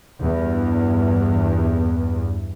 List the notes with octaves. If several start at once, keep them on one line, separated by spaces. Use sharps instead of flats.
E2 G2